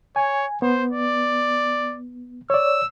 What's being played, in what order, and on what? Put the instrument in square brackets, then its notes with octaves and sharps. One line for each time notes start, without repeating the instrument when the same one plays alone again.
[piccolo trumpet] C#5 [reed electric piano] G#5
[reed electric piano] B3 [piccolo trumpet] C5
[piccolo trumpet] D5
[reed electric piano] C#5 D5 [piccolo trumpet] E6